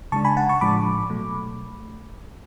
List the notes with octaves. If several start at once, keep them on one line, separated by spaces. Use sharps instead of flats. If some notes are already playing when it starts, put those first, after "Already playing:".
C#3 G#3 D4 A5 C#6
G#5 B5
F#5 A5
A5 C#6
A2 F3 G#3 D4 B5 D6
B2 F#3 A3